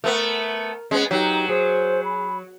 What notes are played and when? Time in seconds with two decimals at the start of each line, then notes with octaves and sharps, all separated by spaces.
0.04 A3 B3 A#4
0.91 G#3 B3 C#4
1.11 F#3 D#4 G4
1.49 G#4 C5
2.04 B5